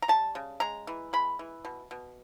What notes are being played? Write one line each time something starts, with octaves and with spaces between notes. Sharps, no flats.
A#5
G3 A5
C#3
G#3 A#5
E3
G#3 B5
E3
B2
B2